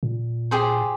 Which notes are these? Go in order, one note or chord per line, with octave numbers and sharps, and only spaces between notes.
A#2
G4 G#4 C5